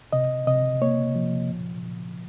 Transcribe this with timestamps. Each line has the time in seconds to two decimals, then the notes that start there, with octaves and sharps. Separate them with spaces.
0.13 C3 D#5
0.47 C3 D#5
0.82 A#3 C#5
1.15 F3
1.50 A#2
1.84 A#2